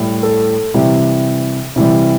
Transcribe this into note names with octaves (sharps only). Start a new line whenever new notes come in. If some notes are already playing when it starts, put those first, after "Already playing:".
Already playing: A2 G3
A4
C3 E3 G3 G4
C3 E3 G3